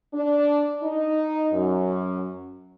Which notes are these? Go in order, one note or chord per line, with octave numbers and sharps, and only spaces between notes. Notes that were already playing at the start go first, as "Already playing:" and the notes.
D4
D#4
F#2